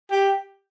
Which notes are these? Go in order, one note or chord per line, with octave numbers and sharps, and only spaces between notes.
G4